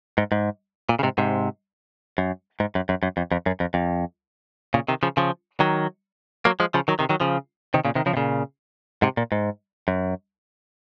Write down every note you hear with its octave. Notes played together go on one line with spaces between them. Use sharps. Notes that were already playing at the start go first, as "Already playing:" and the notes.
G#2
G#2
A#2
C#3
G#2 C3
G#2 C3
F#2
G#2
F#2
F#2
F#2
F2
F2
F#2
F2
F2
A#2 C#3
C3 D#3
C#3 F3
C#3 F3
D#3 F#3
F#3 A#3
F3 G#3
C#3 F3
D#3 F#3
C3 D#3
D#3 F#3
C#3 F3
C3 D#3
A#2 C#3
C3 D#3
C#3 F3
C3
A#2 C#3
G#2 C3
A#2
G#2
F#2